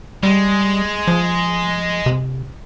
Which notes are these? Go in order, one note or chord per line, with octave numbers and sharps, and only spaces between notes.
G3 G#3
F3
C3